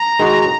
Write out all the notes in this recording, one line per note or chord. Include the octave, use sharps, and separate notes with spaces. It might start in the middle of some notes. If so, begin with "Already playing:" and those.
Already playing: A#5
D#3 G#3 D#4 F#4